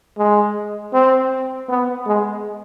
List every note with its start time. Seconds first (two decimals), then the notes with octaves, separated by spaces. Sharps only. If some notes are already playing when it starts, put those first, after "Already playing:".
0.18 G#3
0.93 C4
1.69 B3
2.07 G#3